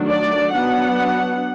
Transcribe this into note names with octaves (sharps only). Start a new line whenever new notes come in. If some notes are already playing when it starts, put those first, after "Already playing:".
Already playing: D#3 F#3 A3 D4
D5
F#3 B3 D4 F#5